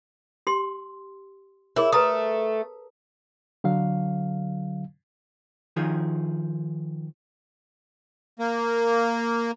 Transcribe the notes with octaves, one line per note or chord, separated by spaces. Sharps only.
G4 C6
E4 G#4 A#4 C#5
A3 B4 A#5 D#6
D3 F#3 F5
D#3 F3 G#4
A#3